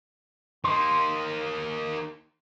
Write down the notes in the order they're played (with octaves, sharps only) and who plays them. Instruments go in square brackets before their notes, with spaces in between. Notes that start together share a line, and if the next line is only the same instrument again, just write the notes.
[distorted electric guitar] A#3 D#4 [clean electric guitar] C6